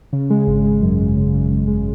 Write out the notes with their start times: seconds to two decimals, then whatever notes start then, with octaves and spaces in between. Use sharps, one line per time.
0.13 C#3
0.30 G#3
0.47 G#1
0.64 G#3
0.82 F#2
0.99 F#2
1.17 C#3
1.33 C#3
1.51 C#3
1.68 G#3